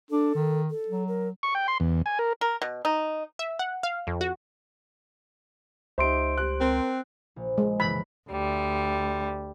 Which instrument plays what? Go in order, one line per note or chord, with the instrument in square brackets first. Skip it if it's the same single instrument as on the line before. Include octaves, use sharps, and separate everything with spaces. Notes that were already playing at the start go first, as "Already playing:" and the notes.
[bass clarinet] D4 [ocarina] A4
[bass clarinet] D#3
[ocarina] A4
[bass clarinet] F#3
[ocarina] A#4
[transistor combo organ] C#6
G5
C6
E2
G#5
A#4
[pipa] A#4
B2
D#4
[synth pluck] E5
F#5
F5
F2
F#4
[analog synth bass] C#2 [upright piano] D#4 G4 E5 [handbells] C5 C6 D7
[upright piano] G3 F#6
[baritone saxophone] C4 [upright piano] A#4
[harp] A#1
[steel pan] G#3
[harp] F#1 B1 E3 [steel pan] B5
[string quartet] D2 G3